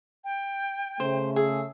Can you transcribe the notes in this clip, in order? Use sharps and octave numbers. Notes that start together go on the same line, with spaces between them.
G5
C#3 A3 C5
G#4 E6